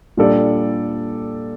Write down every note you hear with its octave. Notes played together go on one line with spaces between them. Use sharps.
A#2 G3 D4 A4 D5